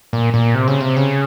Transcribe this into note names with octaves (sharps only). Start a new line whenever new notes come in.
A#2
A#2
C3
C#3
C3
C#3